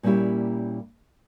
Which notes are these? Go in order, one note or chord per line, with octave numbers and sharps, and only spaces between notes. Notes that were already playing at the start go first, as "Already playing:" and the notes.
A#2 G3 A#3 C#4 E4 G4